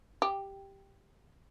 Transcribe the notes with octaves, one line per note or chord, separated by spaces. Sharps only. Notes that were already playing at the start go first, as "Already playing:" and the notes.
G4